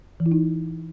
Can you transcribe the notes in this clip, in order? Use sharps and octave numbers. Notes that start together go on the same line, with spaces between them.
E3
E4
D#4